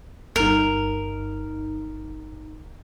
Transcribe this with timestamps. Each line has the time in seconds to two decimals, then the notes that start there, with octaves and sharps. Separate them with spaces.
0.36 G1 G2 D#4 A#4